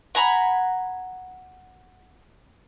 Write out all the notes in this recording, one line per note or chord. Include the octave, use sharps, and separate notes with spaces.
F#5 G#5 A#5 B5